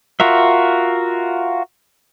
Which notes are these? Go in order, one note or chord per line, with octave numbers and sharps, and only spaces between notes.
F4 F#4 A#4 E5